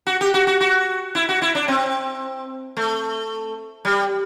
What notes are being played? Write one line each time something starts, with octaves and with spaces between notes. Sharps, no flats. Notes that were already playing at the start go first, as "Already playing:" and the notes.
F#4
G4
F#4
F#4
F#4
E4
F#4
E4
D4
C4
A3
G3